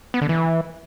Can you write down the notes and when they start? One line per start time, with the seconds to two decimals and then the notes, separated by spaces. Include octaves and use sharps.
0.14 B3
0.22 D3
0.29 E3